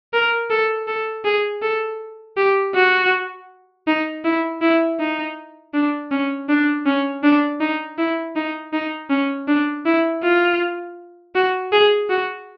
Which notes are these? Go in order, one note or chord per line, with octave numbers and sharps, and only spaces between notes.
A#4
A4
A4
G#4
A4
G4
F#4
D#4
E4
E4
D#4
D4
C#4
D4
C#4
D4
D#4
E4
D#4
D#4
C#4
D4
E4
F4
F#4
G#4
F#4